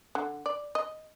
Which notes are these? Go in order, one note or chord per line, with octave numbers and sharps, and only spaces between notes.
D3
D5
D#5